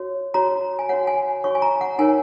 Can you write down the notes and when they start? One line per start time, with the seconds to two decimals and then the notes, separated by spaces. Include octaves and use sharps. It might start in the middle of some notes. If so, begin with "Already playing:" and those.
Already playing: F#4 C#5
0.34 F#4 C#5 A#5
0.79 G#5
0.89 F#4 C#5 F#5
1.07 G#5
1.44 F#4 C#5 C#6
1.55 G#5
1.62 A#5
1.81 F#5
1.99 D#4 A#4 C#5 G#5